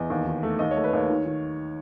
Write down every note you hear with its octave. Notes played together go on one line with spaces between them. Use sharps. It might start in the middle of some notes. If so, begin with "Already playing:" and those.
Already playing: E2 D#5
D#2
D#3
A3
D#2 D#5
C#5
A3
B4
D#2 C#5
D#3
D#3